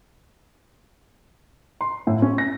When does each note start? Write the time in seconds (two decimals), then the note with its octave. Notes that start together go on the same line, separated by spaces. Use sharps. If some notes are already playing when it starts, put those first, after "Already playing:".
1.81 C6
2.07 A2
2.22 C#4
2.38 A#6